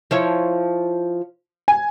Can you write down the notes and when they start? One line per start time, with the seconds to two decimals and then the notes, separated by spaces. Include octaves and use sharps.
0.11 F3 E4 C#5
1.68 G#5